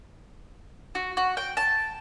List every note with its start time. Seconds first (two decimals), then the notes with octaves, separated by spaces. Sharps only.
0.95 F#4
1.17 F#4
1.37 G5
1.57 A5